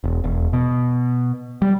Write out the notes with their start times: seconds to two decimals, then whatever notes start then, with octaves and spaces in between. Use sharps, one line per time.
0.04 E1
0.24 E1
0.53 B2
1.62 G3